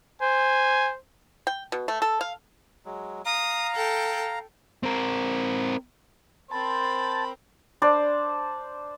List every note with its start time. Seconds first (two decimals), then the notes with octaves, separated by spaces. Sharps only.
0.21 C5 G#5
1.47 G5
1.72 B2
1.88 A3
2.02 A4
2.21 F5
2.85 F#3 G#3
3.26 F5 A#5 D#6
3.75 A4 G5
4.83 C4 A#4
6.51 C4 A#4 C5 A5 B5
7.82 D4 C5 D5